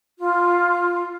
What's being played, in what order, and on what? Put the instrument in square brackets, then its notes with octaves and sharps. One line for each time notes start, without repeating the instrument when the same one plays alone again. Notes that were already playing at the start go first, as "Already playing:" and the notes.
[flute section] F4